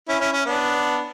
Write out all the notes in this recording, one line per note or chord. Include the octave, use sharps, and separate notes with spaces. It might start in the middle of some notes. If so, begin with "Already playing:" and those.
C#4 E4
C#4 E4
C#4
B3 D4